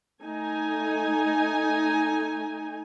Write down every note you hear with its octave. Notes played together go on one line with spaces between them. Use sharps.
A3 D#4 G#5